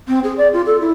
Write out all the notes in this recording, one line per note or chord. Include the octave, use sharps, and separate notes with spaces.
C4
G#4
D5
F4
A4
E4